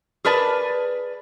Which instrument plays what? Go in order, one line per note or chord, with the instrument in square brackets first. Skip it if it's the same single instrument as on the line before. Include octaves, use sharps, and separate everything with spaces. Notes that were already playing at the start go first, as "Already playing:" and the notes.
[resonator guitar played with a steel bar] G#4 A#4 B4 D5 A5